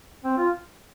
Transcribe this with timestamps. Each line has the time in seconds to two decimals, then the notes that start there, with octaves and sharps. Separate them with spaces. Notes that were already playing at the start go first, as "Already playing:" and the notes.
0.24 C4
0.38 F4